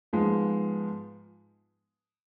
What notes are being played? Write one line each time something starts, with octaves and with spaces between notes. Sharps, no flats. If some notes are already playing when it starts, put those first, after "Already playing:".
G#2 F3 G#3 B3